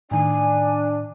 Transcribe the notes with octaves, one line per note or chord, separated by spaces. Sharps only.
A2 D#3 D4 G#5